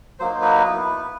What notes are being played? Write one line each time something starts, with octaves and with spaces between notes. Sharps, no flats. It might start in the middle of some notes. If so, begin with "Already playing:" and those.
F#3 A#3 D#4 C5
B4
B3 E4